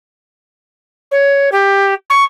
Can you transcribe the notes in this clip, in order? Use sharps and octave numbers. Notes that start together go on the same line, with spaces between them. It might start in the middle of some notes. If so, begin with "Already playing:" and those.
C#5
G4
C#6